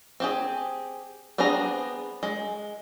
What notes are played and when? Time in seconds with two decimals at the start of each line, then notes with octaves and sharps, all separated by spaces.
0.20 C4 G4 G#4
1.38 B3 C4 D4 G#4 A#5
2.23 G#3